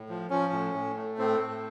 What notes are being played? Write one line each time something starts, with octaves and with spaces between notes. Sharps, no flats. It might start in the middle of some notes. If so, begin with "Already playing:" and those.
Already playing: A2
F3
F3 C#4
A2
A2
A3
A2 C4
A2